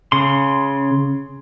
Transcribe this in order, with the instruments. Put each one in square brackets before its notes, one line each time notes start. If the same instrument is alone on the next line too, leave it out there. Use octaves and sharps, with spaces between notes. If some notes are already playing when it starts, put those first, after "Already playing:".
[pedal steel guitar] C#3 C6